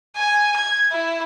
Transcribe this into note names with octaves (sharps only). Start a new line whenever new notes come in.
G#5
G#6
E4